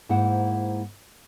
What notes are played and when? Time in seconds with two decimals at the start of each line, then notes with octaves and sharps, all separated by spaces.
0.09 G#2 A#3 E4 C5 F#5